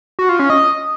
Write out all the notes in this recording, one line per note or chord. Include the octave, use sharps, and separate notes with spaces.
F#4
F4
C#4
D#5